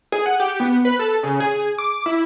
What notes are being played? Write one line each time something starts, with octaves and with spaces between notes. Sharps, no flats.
G#4
F#5
G4
B3
B4
A4
C#3
G#4
D6
E4